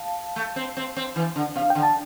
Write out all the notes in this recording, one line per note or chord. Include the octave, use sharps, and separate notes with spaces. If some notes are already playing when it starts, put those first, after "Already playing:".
Already playing: F5 A5
A3
C4
C4
C4
E3
D3
C3 F5
D3 G5
A5